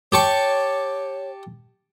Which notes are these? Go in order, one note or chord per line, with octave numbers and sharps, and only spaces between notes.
G4 C#5 A5 C#6